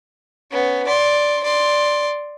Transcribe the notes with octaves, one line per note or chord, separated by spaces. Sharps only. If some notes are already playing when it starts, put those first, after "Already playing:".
B3 C#4
D5 C6
D5 C6